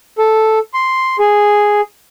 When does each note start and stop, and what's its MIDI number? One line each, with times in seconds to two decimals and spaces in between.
0.18 0.59 69
0.74 1.17 84
1.19 1.81 68